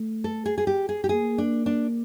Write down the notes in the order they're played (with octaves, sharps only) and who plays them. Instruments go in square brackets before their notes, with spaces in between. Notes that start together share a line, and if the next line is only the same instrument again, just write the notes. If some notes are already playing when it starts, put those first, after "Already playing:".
Already playing: [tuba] A3
[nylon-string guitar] A4
G#4
G#4
G4
G#4
G4
[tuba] A#3 [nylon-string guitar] G#4
[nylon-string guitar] D4
D4